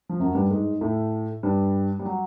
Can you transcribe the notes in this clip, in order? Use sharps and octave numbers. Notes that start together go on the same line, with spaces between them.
F3
F#2 F#3
G2 G3
G#2 G#3
A2 A3
G2 G3
G3
F#3